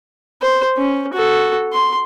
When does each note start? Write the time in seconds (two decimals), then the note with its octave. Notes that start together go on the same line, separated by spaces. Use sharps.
0.42 C5
0.77 C#4
1.14 F#4 A4
1.73 C6